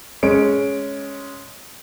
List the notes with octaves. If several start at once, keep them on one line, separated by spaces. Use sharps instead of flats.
G#3 C#4 D7